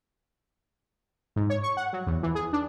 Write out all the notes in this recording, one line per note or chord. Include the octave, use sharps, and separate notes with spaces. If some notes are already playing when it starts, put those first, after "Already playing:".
G#2
C#5
C#6
F#5
F#3
E2
E3
G#4
D4